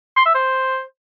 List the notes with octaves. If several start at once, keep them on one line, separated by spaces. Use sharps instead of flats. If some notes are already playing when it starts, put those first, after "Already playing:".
C6
E5
C5